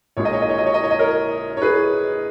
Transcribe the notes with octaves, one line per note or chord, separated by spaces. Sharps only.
A#1 A#2 G#3 C#5
D#5
C#5
D#5
C#5
D#5
C#5
D#5
C#5
D#5
A#4 C#5
C#5
G#4 B4